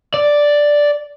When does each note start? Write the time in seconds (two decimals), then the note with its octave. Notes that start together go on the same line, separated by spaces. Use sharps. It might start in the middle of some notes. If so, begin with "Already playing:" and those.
0.14 D5